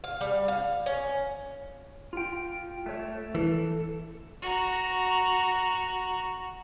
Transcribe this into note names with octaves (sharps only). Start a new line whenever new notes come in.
F5
G3
F5
C#4
F4 G5
A3 C#5
E3 A4
F#4 A#5